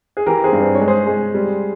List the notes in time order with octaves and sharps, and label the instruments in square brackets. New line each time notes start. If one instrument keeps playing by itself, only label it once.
[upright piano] G#4
E3 G4 A#4
G#4 C5
G2
C5
C#5
G#3
G#4 C5
G#3
G3